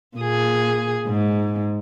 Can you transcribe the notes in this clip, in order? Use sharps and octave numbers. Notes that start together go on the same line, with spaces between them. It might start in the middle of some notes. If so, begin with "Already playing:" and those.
A#2 G#4
G#2